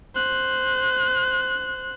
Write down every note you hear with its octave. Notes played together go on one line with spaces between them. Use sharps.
C5 F#6